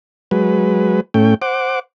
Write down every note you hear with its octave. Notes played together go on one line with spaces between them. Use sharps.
F#3 G#3 B4
A2 A3 C#4 G5
C5 F#5 D6